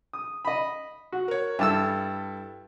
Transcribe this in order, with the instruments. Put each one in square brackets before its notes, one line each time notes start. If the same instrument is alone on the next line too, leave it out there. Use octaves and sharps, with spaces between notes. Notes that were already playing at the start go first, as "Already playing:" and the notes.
[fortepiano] D#6
D#5 B5
F#4
[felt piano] A#4 C#5
[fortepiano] G2 A5 E6 [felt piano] E4 A4